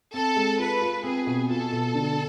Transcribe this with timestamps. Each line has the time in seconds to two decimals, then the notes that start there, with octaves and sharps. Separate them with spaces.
0.14 C4 A4
0.36 G#3
0.59 F4 B4
0.81 F4
1.04 C4 G#4
1.27 B2
1.50 F4 A4
1.72 B2
1.94 D3